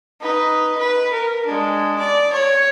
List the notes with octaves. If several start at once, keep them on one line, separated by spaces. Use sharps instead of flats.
D#4 B4
B4
A#4
G#3 D4
D5
C#5